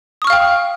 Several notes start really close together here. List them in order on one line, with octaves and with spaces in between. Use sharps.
D#6 C#6 F6 F5 G5